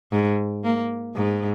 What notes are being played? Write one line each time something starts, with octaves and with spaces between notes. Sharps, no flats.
G#2
A#3
G#2